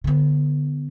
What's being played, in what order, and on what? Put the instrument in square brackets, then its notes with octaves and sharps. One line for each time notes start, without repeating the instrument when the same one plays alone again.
[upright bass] D3 B3